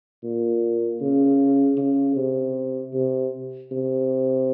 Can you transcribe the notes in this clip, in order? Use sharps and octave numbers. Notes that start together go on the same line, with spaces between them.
A#2
C#3
C#3
C3
C3
C3